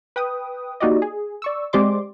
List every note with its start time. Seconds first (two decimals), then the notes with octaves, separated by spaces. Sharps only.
0.16 B4 G5 D#6
0.80 A#3 D#4 F#4 G4 D5 D#5
1.02 G#4
1.42 D5 C#6 E6
1.73 G#3 C4 G4 D5 C6 D6